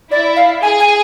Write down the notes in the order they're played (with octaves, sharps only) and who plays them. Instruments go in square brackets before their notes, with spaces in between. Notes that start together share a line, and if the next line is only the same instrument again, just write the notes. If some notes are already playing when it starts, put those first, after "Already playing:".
[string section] E4 [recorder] D5
[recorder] F5
[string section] G#4 [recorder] G#5
[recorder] G#5